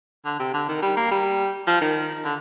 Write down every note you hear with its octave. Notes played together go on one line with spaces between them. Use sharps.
D3
C3
D3
D#3
G3
A#3
G3
F3
D#3
D3